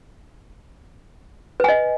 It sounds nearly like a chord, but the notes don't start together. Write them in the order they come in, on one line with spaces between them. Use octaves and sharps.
B4 G#5 D#5